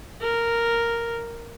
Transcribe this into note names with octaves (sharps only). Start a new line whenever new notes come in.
A#4